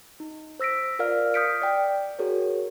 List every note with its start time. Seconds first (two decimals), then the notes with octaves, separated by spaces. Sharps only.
0.20 D#4
0.60 C5 E6 A#6 B6 D7
0.99 F4 A#4 D5 F5 F6
1.34 D#6 F6 G6 B6 C#7 D7
1.62 D5 G5
2.19 F#4 G#4 A#4 C#5